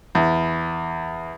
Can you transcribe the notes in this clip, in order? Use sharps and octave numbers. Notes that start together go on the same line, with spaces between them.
E2